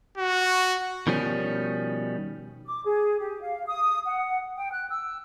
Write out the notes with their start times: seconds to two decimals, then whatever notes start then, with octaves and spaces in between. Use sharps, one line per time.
0.18 F#4
1.07 B2 D#3 F3 G3 C#4
2.67 D6
2.85 G#4
3.19 G4
3.40 F5
3.66 D#6
4.06 F#5
4.57 G5
4.72 F#6
4.89 E6